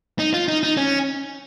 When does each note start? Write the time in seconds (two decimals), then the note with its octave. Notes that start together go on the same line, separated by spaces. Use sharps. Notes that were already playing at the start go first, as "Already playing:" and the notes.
0.19 D#4
0.34 F4
0.48 D#4
0.63 D#4
0.77 C#4